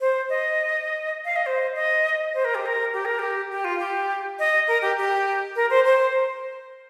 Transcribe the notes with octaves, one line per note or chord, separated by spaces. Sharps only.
C5
D#5
F5
D#5
C5
D#5
C5
A#4
G4
A#4
G4
A#4
G4
G4
F4
G4
D#5
A#4
G4
G4
A#4
C5
C5